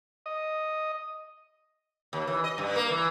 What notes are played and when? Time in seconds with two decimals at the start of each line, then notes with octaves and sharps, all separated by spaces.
0.26 D#5
2.13 D#2
2.27 E3
2.44 D#5
2.58 G2
2.76 A#3
2.90 E3